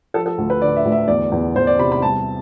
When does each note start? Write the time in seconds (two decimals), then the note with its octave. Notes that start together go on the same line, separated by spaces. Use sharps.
0.14 F3 A4
0.26 A4
0.38 D2
0.50 B4
0.62 D3 D5
0.76 E5
0.85 D2
0.92 E5
1.08 E2 D5
1.32 E2
1.55 E2 C5
1.67 D5
1.79 C3 B5
1.92 B5
2.02 G3 A5